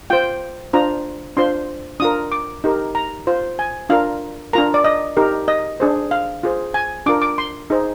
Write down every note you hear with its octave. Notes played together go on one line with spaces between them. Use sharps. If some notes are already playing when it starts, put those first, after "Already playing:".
F4 C5 G5
D4 F4 C5 A#5
D4 F4 C5 C6
D4 F4 A#4 D#6
D6
D#4 G4 A#4
A#5
F4 C5
G#5
D4 F4 A#4 F5
D4 F4 A#4 A#5
D5
D#5
D#4 G4 A#4
D#5
D4 G#4 C5
F5
F4 G#4 C5
G#5
D4 F4 A#4 D6
D6
C6
D#4 G#4 C5